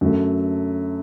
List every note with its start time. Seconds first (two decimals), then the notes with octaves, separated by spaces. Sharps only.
0.01 F#2 D3 F#3 A3